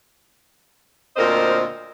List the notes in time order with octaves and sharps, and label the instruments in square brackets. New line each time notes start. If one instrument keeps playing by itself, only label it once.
[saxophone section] D2 A#2 C4 A#4 C5 D#5